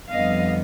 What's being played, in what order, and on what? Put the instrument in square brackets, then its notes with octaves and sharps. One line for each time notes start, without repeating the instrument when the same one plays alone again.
[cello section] F2 D3 G3 B3 D#5 F5